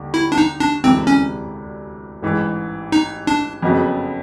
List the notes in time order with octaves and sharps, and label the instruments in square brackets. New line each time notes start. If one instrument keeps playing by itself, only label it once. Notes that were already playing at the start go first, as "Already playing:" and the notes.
Already playing: [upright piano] D#2 D3 G3
[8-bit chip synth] E4
D4
D#4
D4
[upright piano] E1 D2 C3 E3 [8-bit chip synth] C4
[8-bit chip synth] C#4
[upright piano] A1 G#2 E3
[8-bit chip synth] D#4
D4
[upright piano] F#1 F2 C#3 F#3 B3